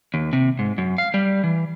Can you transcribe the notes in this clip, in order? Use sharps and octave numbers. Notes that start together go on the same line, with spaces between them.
D#2
C3
G#2
F#2
F5
G3
E3